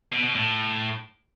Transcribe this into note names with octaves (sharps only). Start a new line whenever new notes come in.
B2
B2
A2